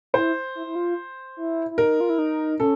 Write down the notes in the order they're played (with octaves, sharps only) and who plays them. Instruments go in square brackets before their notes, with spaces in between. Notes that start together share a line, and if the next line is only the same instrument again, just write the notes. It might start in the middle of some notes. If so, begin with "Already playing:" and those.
[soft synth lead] E4 [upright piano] C5
[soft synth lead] E4
E4
F4
E4
E4
[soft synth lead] D#4 [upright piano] A#4
[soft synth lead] F4
E4
D#4
[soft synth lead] C#4 [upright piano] A4